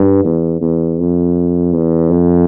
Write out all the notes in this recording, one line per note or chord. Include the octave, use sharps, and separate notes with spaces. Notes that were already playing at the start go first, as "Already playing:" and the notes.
Already playing: G2
E2
E2
F2
E2
F2